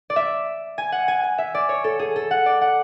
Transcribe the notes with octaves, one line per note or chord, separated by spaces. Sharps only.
D5
E5
G#5
F#5
G#5
G#5
E5
D5
C#5
A4
G#4
A4
F#5
D5
F#5